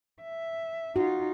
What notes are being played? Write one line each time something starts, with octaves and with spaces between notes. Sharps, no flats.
E5
D#4 F4 F#4